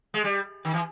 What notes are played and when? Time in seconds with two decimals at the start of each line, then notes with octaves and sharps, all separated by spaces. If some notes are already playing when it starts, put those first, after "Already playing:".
0.14 G#3
0.24 G3
0.65 D#3
0.74 E3